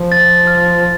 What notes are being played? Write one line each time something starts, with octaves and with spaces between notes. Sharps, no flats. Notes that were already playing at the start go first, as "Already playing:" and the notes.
Already playing: F3
A6
F6